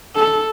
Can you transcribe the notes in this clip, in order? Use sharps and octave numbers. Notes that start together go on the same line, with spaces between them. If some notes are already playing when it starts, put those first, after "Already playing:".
A4